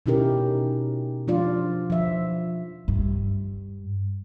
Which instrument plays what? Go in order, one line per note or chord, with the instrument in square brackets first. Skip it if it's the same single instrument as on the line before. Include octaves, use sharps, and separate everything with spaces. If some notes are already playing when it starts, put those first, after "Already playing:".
[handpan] B2 C#4 D#4 E4 G4 A#4
F3 D4 F4 D5
F3 E5
[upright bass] G2